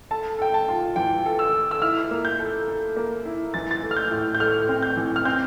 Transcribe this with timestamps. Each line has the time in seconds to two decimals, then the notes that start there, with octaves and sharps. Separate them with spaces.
0.11 A4 A5
0.39 A4 G5
0.54 A5
0.68 F4
0.96 E3 G5
1.26 A4
1.39 E6
1.53 A4
1.71 E6
1.82 E4 F6
2.11 A#3
2.25 G6
2.39 A4
2.68 A4
2.96 A#3
3.25 E4
3.54 E3 A6
3.71 A6
3.83 A3
3.91 F6
3.96 G6
4.11 A2
4.35 G6
4.40 A3 F6
4.69 C4
4.83 G6
4.97 E3
5.16 F6
5.25 C4 G6